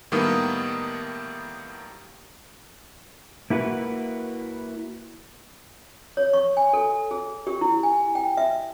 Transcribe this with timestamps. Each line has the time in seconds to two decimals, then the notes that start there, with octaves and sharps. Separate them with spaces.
0.12 A2 D#3 G3 A#3 B3 D#6
3.50 A#3 E4 F#4 B4
6.17 C#5
6.33 C#6
6.57 G#5
6.73 A4
7.11 G#4
7.47 G4
7.61 E4
7.83 G#5
8.15 G5
8.37 E5